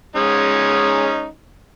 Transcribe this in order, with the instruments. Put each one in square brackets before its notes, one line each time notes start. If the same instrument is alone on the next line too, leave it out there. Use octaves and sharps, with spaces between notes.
[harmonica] G#3 C#4 D#4